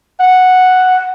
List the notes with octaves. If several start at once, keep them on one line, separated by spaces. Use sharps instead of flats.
F#5